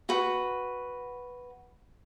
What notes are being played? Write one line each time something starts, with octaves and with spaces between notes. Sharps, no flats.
F#4 B4